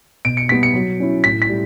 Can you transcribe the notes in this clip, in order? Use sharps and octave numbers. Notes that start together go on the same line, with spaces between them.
B2 D7
C#7
G3 B3 B6
C#7
F#3
C#4 E4
A2 B6
B6
G3